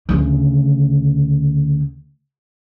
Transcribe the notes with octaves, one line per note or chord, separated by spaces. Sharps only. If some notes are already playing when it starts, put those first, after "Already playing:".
D2 C#3